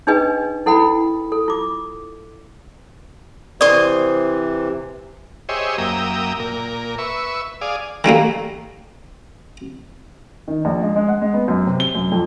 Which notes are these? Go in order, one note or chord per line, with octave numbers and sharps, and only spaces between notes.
D4 D#4 G#4 B4 D#5 G5
E4 A4 F#5 G5 B5
A4
F4 D6
C3 E3 C5 D5 C#6 D#6
G4 G#4 C5 C#5 D#5 E5
F#2 A#3 E5 G5 A#5 D#6
A#2 A#4
B4 E5 C#6
G#4 D5 F5 D#6
D#3 G3 A3 A#3
D#3
A#1
G#3
G#3
F#5
G#3
B3
F#2
C3
G7
F#2
F2